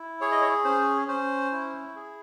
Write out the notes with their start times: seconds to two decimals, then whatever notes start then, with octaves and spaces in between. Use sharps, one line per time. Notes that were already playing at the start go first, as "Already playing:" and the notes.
Already playing: E4
0.21 G#4 C#5
0.32 D#5
0.41 C#5
0.64 C#4 C5
1.08 C#4 C5
1.52 E4
1.96 G#4